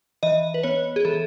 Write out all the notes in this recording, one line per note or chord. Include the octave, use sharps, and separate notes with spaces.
E3 D#5
B4
B3 C#5
G#4
E3 A4